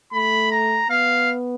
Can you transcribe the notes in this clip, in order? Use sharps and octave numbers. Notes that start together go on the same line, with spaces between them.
A3 B5
A#5
B3 F5